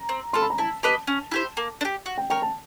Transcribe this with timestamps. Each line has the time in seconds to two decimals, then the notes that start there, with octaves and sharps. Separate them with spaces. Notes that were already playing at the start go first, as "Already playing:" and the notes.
Already playing: A#5
0.09 C4
0.33 F4 A4 C6
0.42 B5
0.50 A#5
0.58 E4 A5
0.83 G4 B4 D#5 A5
1.07 C#4
1.31 E4 G4 C5
1.57 A#3
1.81 D4
1.85 G4
2.06 F#4
2.18 G5
2.30 A#4 C#5 G5
2.42 A5